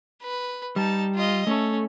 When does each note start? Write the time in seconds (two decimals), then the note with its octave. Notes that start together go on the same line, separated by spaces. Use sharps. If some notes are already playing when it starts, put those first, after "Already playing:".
0.22 B4
0.76 G3 D#4 A5
1.15 F4 D#5
1.47 A3 C#4 A4